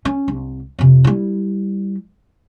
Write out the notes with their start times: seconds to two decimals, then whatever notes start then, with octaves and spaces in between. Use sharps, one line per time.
0.05 C#4
0.28 C2
0.79 F2 C3
1.04 G3 E4